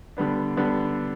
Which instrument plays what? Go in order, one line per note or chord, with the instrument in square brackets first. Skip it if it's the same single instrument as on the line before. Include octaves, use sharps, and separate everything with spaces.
[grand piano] D3 G3 B3 D4
D3 G3 B3 D4